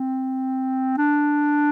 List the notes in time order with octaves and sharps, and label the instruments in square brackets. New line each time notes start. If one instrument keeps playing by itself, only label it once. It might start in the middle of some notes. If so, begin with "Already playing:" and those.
Already playing: [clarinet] C4
D4